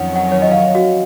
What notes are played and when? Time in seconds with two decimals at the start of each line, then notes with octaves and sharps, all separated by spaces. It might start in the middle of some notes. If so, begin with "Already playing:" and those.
Already playing: F2 D#3 F#3 C#4 F#5
0.16 F#5
0.32 C#5
0.42 D#5
0.52 F5
0.75 F#4